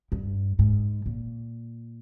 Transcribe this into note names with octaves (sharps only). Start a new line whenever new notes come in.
G2
G#2
A#2